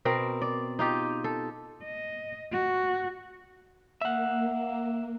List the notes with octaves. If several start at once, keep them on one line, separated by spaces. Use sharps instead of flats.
B2 C4 A#4
D5
D#4 F4 G4
A4
D#5
F#4
A#3 E5 F#5